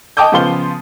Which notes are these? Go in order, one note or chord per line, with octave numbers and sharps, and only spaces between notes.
D#5 G5 A5 D6 D#6 G6
C#3 F3 B3 F4 C6 G7